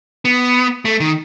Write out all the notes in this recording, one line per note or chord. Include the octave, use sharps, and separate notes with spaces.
B3
A3
D#3